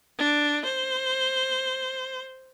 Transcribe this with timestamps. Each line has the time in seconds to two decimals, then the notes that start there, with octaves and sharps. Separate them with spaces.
0.19 D4
0.65 C5